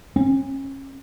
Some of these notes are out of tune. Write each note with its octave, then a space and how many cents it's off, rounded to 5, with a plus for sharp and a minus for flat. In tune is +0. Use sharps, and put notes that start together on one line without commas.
C#4 -30